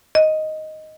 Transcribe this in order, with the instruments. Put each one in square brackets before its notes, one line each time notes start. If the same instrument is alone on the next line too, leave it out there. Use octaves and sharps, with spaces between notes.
[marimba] D#5